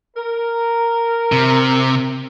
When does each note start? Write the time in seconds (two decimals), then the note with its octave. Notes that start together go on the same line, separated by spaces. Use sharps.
0.16 A#4
1.32 C3